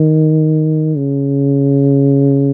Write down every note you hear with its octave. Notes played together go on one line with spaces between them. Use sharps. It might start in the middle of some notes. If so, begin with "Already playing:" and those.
Already playing: D#3
C#3